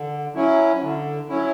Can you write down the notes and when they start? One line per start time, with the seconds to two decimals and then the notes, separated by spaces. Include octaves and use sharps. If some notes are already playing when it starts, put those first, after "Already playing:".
Already playing: D3
0.35 F#3 C#4 E4
0.82 D3
1.28 F#3 C#4 E4